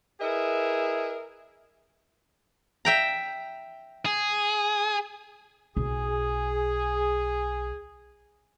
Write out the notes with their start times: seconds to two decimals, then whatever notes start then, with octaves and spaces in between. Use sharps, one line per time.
0.21 E4 G#4 A#4 B4 D#5 E5
2.85 E5 G5 A#5
4.06 G#4
5.77 B1 G#4